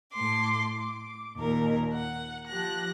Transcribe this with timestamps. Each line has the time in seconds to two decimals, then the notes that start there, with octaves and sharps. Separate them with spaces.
0.13 A2 C6 D6
0.73 D6
1.38 D#2 A#2 A#4
1.94 F#5
2.46 F3 G4 F#6 A#6